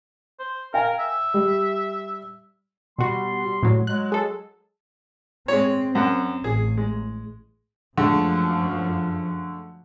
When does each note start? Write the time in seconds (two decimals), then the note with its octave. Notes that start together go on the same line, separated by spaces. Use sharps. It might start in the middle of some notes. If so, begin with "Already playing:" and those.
0.39 C5
0.74 A#4 F5 G5 G#5
0.99 E5
1.34 G3
2.99 B2 G3 F#4 C6
3.63 A2 F#3
3.87 F#3 G#3 F#6
4.12 G#4 A4
5.48 G#3 C4 C#5
5.95 F#2 F#5
6.44 A1 G#4
6.77 G#3
7.98 F#2 D3 F3 G#3 A3